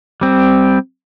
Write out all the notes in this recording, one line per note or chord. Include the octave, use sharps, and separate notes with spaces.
G3 C4